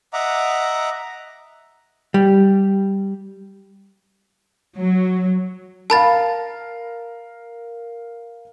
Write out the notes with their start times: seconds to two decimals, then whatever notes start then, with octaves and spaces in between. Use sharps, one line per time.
0.13 D#5 E5 F#5 A#5 D6
2.14 G3
4.77 F#3
5.90 A#4 F5 A5 B5 A6